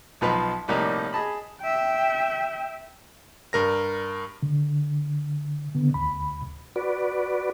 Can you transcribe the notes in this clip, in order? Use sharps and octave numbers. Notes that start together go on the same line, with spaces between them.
B1 B2 F3 D#4 B4 C6
A#1 A2 C3 G3 A#3 D#4
G#4 D#5 A5 B5
E5 G5
G2 A#4 A#6
D3
D3 B3
D2 B5
F#4 B4 D5